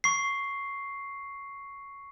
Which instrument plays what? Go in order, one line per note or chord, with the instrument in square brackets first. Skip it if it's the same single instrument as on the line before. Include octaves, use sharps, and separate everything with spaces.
[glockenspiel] C#6 C7